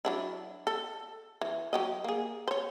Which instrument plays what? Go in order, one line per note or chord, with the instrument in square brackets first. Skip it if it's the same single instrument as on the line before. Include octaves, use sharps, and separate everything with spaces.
[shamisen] F#3 D4 E4
A4
E3
F#3 G4 D#5
A#3 G#4
C5 C#5